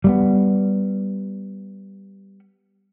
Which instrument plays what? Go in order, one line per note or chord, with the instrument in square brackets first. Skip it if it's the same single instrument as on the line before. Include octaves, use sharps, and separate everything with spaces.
[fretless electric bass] G3 A3 B3